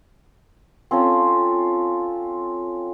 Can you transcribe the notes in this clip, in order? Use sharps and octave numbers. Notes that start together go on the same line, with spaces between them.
C4 C#4 F4 A4